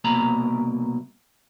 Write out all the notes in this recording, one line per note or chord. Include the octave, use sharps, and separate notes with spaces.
C2 B2 A#3 A#5 B5